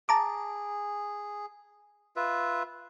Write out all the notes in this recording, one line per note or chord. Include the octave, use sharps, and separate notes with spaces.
G#4 A5 A#5 D6
F4 B4 E5